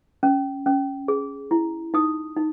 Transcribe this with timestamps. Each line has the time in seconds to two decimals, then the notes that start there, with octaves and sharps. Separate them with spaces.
0.23 C#4
0.66 C#4
1.08 G#4
1.51 E4
1.94 D#4 D#6
2.37 D#4